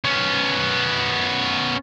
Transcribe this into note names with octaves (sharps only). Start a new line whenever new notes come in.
B3 C#4